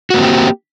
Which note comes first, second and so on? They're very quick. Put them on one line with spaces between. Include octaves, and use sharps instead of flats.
F#4 A#3 C4 G4